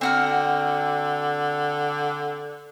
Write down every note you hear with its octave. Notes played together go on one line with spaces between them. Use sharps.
D3 C4 F#4 A#4